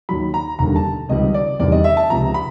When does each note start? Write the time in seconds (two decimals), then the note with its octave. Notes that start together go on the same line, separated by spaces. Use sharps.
0.09 D#2 D#3 F#3 B5
0.34 A#5
0.59 E1 D#2 D3 G3 A#3 A#5
0.76 A5
1.09 C#2 C3 D#3 G3 D#5
1.34 D5
1.60 E2 C3 D#3 G3 D5
1.72 D#5
1.84 E5
1.97 A5
2.10 C#2 C3 F3 A#5
2.34 B5